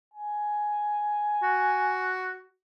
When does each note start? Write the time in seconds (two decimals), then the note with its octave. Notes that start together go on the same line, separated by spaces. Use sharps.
0.14 G#5
1.43 F#4